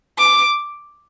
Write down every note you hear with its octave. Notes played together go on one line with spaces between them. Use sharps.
D6